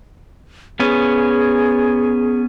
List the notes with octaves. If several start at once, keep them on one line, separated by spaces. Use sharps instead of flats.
B3 C#4 G#4